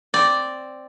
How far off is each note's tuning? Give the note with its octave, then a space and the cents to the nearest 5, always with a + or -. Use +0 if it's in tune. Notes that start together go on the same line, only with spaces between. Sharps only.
C4 +0 D5 +0